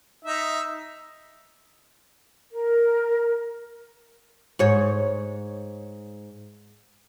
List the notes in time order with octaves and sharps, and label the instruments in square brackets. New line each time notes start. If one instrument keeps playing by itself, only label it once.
[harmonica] D#4 E5
[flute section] A#4
[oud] G#2 C#5